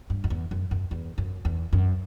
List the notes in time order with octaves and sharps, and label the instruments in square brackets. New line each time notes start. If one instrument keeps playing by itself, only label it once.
[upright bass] G2
F#2
E2
F#2
F#2
E2
F#2
E2
F#2